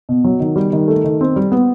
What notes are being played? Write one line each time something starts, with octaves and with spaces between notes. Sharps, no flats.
B2
F#3
D#3
G3
D#3
A3
D#3
C4
G3
B3